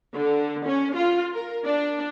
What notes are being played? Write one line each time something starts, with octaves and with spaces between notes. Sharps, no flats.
D3
C#4
F4
A#4
D4